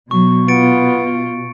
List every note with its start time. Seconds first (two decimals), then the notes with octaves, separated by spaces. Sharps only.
0.11 B2 F#3 C#6
0.48 B3 F4 A6 C#7 D7